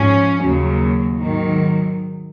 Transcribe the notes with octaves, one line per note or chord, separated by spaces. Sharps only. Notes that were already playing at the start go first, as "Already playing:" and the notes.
Already playing: G#2 F3 C#4
D#2 C#3 F#3
G#2 D#3 F#3